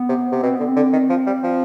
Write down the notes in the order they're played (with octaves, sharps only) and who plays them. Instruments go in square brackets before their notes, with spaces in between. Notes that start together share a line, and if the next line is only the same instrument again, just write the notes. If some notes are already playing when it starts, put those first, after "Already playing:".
Already playing: [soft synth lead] B3
[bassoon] C3
C3
[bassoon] B2 [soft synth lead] C4
[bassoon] D3 [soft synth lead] B3
[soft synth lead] C4
[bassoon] D3
D#3
F3
G3
F3